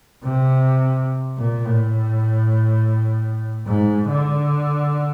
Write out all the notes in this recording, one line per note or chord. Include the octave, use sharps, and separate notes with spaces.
C3
A#2
A2
G#2
D3